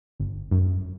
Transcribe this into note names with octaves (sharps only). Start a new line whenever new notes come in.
G1
F#2